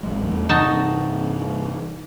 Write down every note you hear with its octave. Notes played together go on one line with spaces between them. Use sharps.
A1 G#3
E2 G3 A3
G2 C3 E3 D#4 F#4 A5